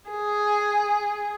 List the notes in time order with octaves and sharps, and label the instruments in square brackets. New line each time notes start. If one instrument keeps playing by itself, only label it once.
[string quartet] G#4